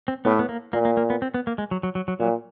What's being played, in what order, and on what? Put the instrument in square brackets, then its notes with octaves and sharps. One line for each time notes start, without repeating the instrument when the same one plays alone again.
[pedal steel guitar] C4
[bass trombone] A2 [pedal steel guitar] B3
[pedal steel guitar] B3
A#3
[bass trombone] A#2 [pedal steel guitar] A#3
[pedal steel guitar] A#3
A#3
B3
C4
B3
A#3
G#3
F#3
F#3
F#3
F#3
[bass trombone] A#2 [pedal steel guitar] F#3